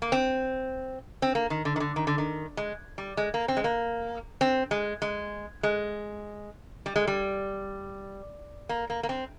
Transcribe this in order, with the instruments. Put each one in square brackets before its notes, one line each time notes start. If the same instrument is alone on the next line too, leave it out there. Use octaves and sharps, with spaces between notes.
[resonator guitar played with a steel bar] A#3
C4
C4
A#3
D#3
D3
D#3
D3
D#3
D3
D#3
G#3
G3
G#3
A#3
C4
G#3
A#3
C4
G#3
G#3
G#3
G3
G#3
G3
A#3
A#3
A#3
C4